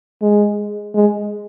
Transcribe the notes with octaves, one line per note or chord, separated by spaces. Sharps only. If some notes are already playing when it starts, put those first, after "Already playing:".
G#3
G#3